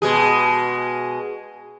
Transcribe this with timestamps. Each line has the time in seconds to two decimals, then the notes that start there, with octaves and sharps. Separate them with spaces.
0.02 B2 G#3 G#4